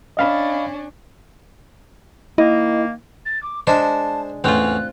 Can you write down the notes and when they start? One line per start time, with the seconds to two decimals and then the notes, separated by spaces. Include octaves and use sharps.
0.17 C#4 D4 D#5 F5 B5
2.38 D#3 A#3 E4 D#5
3.25 A6
3.43 D6
3.67 G#3 D4 C5 E5 A5
4.44 E2 A2 C4 C#4 F4 F#6